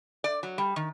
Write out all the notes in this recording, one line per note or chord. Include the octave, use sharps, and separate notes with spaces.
D5
F#3
G3
D#3